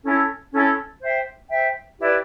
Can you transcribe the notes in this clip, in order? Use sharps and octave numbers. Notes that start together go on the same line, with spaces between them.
C#4 E4 A4
C#4 E4 A4
C5 E5 G5
C5 E5 G5
E4 G4 B4 D5